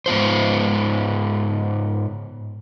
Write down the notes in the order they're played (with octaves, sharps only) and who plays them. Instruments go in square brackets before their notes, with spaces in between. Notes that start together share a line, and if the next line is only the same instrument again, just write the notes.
[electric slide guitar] G#2 B3 F4 C5